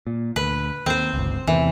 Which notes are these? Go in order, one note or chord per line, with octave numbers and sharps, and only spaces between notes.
A#2
D2 B4
D#2 C4 C5
G1 C#2
E2 C3 E3